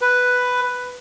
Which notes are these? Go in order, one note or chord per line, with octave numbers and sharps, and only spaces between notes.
B4